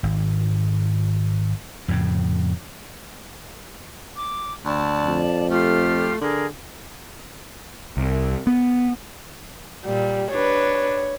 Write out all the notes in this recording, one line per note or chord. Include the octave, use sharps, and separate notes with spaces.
G#1
F2 A2 C#3
D6
D2 D5 A5
F2
A3 F4 G4 F6
D3 G#4 A#4
C2
B3
A#2 G3
D4 B4 C#5